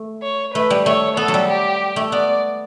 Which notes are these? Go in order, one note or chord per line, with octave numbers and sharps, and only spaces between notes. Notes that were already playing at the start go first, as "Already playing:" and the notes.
Already playing: A3
C#5
A3 B4
G3
A3 C#5
B3 A4
F#3
G3
G4
A3
B3 D5